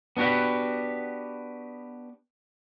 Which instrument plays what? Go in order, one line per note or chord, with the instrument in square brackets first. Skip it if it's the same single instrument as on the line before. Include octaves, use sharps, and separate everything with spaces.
[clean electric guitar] B3 D4 F#4 G4 B4